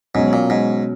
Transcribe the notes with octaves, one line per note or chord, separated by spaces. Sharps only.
G#2 B2 F#3 C#4
A#2
G#2